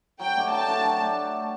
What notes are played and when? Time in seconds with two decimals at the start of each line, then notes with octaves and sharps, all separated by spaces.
0.20 F#3 G5
0.36 A3 D4 G4
0.51 F#3 A5
0.67 A3 D4 G4
0.84 F#3
1.00 A3 D4 G4